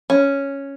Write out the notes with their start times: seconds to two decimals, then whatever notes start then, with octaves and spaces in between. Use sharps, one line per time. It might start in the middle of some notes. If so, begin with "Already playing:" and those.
0.10 C#4